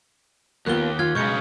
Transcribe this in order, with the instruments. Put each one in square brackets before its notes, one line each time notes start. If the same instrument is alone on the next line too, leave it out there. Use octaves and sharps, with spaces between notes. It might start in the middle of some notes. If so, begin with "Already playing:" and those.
[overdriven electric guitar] D#2 [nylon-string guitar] A#3 B3 F4 [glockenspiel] F#6 G7
[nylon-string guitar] F4 [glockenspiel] F6 G#6
[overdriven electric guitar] B1 C#3 [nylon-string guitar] G#3 [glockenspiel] C#6 G6 C#7